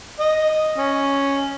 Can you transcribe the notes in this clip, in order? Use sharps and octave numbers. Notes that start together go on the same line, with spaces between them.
D#5
C#4